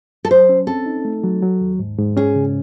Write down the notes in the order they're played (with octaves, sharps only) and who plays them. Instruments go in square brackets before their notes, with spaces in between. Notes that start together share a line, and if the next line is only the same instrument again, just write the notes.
[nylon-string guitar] A4
[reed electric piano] F#3 [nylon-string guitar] C5
[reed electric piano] C#4
[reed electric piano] C4 [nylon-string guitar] A4
[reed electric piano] D#4
A3
F#3
F#3
D#2
G#2
G#2
[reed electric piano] C#4 [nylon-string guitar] G#4
[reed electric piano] C#3